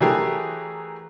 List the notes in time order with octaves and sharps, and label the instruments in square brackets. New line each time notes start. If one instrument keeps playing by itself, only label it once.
[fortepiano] E3 F#3 A3 G4 G#4 A#4